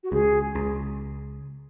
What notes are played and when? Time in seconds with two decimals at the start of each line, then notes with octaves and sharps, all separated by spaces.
0.04 F#4
0.12 C#2 G#4
0.55 C#2